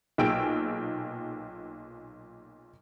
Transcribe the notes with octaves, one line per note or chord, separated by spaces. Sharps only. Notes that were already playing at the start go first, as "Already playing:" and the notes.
B1 A#2 G#4 G5 E6 D7